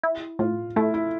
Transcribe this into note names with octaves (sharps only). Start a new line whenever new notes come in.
E4
A2 F4
A3 E4
E4